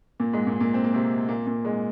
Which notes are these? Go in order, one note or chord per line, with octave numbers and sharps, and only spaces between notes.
A#2 A#3
G#2 G#3
A#2 A#3
A#2 A#3
C4
A#3
C3 C4
A#2 A#3
A#2 A#3
G#2 G#3